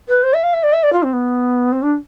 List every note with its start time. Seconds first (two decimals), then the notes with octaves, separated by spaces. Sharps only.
0.08 B4
0.23 C5
0.33 E5
0.43 F5
0.53 E5
0.63 D5
0.73 E5
0.83 D5
0.93 F4
1.03 C4
1.13 B3
1.72 C4
1.82 D4